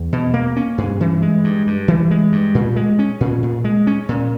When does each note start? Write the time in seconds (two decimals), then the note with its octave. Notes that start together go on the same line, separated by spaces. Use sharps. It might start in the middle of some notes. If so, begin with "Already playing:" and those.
Already playing: E2
0.13 B2
0.34 A#3
0.56 C#4
0.78 G2
1.00 E3
1.22 G#3
1.44 G2
1.67 G2
1.88 E3
2.11 G#3
2.32 G2
2.55 A#2
2.76 G#3
2.99 C#4
3.21 A#2
3.43 A#2
3.64 G#3
3.87 C#4
4.09 A#2